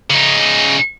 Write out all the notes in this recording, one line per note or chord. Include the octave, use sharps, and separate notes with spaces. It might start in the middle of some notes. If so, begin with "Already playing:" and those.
C#3 D#4